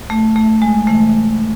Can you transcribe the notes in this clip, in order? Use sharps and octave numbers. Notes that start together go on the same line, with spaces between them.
A3
A3
G#3
C3 E3 A3